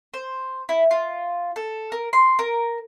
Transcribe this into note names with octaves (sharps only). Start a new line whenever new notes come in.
C5
E4
F4
A4
A#4
C6
A#4